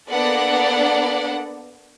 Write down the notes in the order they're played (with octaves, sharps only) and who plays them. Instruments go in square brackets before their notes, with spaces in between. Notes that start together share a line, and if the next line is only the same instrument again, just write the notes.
[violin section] A#3 B3 D4 A4 D5 F#5